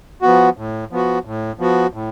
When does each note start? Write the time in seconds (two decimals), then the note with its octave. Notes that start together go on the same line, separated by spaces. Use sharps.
0.22 F3 B3 F#4
0.57 A2
0.91 F3 B3 F#4
1.25 A2
1.59 F3 B3 F#4
1.93 A2